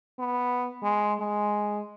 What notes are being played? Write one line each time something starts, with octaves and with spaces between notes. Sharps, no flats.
B3
G#3
G#3